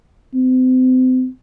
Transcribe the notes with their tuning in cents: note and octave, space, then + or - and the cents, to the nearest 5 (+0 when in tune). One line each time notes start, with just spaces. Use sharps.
C4 -35